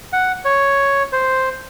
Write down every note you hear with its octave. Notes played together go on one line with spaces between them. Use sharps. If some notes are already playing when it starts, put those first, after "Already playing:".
F#5
C#5
C5